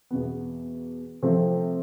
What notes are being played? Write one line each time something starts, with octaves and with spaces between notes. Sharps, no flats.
E2 B2 B3
C3 F3 A3 C4